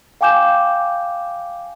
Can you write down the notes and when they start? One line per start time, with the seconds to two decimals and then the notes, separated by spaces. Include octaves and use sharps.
0.21 F5 G5 G#5 D6 G6 E7